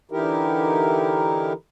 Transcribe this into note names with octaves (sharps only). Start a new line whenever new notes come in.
D3 E3 D#4 E4 G4 A#4